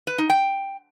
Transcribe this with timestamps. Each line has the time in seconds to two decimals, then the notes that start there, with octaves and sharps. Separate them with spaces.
0.07 B4
0.18 D#4
0.30 G5